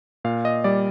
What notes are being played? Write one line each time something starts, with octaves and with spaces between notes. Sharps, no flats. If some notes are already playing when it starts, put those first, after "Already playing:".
A#2 F5
D#5
G3 D5